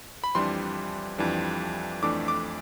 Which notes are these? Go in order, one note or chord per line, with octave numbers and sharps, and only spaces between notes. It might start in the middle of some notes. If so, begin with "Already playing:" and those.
B5
F2 E3 G3 D4 C6
F2 E3 G3 D4
F2 E3 A3 D4 D6
D6